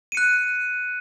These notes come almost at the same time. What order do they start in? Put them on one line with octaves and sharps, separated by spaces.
D#7 C#7 F#6